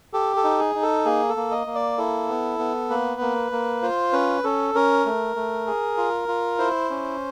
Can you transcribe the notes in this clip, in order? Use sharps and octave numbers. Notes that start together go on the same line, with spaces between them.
G4 A4
A4
D#4
G#4
D#4
A4
A#3 G#4
A4
A#3
D#5
A#3
D5
E4 A4
B3
B3
A#3 B4
A#3
A#3
F4 C5
C#4 B4
C#4 A4
C#4 A#4
A3
A3
G#4
F4
F4
E4 C5
C#4